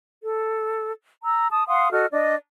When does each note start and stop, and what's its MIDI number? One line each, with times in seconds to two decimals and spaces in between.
0.24 0.93 69
1.24 1.46 82
1.24 1.46 88
1.51 1.66 81
1.51 1.66 87
1.67 1.91 77
1.67 1.91 78
1.67 1.91 84
1.67 1.91 87
1.92 2.06 66
1.92 2.06 69
1.92 2.06 75
1.92 2.06 89
2.11 2.35 62
2.11 2.35 74
2.11 2.35 75